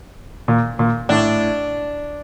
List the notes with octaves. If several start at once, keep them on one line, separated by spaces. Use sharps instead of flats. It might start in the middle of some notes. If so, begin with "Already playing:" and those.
A#2
A#2
A2 D4